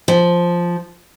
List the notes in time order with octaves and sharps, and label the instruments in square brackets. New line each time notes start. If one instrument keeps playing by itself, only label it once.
[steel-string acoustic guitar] F3